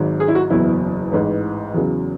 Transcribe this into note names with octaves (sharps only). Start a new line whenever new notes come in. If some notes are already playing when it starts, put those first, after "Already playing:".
Already playing: G#1 G#2 F#3
G#4
E4
F#4
F#1 E2 B2 F#3 E4
A1 G#2 E3
E2 C#3 F#3